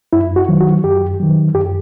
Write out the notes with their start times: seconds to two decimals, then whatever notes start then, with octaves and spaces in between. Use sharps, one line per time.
0.13 F#2 E4
0.36 F#4
0.48 D#3 F#3
0.61 F#4
0.84 F#2 G4
1.20 D#3 F#3
1.55 F#2 G4